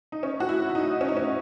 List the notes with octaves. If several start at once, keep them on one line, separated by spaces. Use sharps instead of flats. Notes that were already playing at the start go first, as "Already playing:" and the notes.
D#4
C#4
F#4
E4
E4
D#4
C#4
D#4
C#4